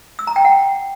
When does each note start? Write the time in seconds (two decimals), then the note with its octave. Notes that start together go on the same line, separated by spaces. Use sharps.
0.19 E6
0.27 A#5
0.36 G5
0.45 F#5